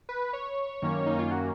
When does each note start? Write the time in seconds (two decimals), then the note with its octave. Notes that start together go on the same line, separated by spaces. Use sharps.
0.09 B4
0.33 C#5
0.82 F#2 D#3 A#3 C#4
1.06 D#4
1.19 F4
1.31 F#4